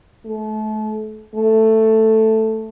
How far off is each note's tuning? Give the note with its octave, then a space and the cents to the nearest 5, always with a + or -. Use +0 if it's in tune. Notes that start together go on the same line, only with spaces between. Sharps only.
A3 -30
A3 +5